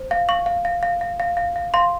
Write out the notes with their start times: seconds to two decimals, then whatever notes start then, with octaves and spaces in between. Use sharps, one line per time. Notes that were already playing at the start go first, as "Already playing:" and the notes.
Already playing: C5
0.11 F5
0.29 F5 C#6
0.46 F5
0.65 F5
0.83 F5
1.01 F5
1.20 F5
1.37 F5
1.56 F5
1.74 F5 C6